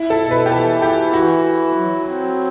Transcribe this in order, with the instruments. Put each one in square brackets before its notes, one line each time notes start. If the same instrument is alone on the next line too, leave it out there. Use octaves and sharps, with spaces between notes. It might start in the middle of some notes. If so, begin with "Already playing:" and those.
Already playing: [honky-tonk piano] E4
A4
[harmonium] B2
[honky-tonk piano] B4
G4
[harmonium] E3 [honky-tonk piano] A4
[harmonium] E4 [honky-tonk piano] G4
[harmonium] E3 [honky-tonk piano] F#4
[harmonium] E4
F#3
C4